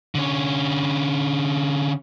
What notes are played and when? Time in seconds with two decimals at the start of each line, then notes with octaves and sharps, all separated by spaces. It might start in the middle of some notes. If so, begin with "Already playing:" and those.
0.15 D3 C#4